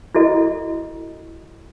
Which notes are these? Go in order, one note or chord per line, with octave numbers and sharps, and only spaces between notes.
E4 F#4 A4 D#5